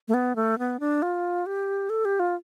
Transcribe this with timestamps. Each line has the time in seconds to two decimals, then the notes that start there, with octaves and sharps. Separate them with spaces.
0.08 A3
0.14 B3
0.36 A3
0.59 B3
0.80 D4
1.02 F4
1.46 G4
1.90 A4
2.05 G4
2.20 F4